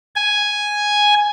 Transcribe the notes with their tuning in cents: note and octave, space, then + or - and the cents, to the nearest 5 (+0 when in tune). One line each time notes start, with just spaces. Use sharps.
G#5 +0